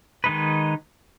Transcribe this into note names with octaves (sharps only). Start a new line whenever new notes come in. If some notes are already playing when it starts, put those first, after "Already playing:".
D#3 G#3 D#4 B4